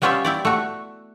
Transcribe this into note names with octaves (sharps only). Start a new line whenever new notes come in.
G3 B3 C#4 F4 G4 E5
E4 G4 D5
A3 F#4